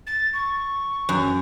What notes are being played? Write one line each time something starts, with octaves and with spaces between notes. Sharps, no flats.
A6
C#6
F#2